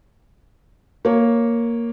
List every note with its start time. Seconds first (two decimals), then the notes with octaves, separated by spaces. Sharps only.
1.05 A#3 C#5